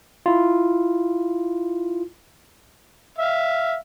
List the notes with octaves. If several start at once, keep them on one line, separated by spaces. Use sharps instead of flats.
E4 F4
E5 F5